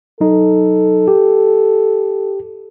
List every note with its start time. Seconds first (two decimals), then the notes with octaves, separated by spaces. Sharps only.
0.21 F#3 D#4 A4
1.08 G4